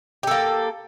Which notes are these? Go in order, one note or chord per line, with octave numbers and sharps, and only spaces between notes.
A#3 G4 A4